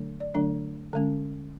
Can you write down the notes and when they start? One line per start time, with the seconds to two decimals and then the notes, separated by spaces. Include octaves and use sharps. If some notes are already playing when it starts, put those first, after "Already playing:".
Already playing: D3 F#3 A3 D4
0.20 D5
0.34 D3 F#3 A3 D4
0.93 D3 G#3 C#4